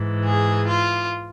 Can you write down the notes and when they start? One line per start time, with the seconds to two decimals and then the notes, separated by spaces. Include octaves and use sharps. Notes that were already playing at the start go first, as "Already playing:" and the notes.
Already playing: G#2 E3
0.25 G#4
0.68 F4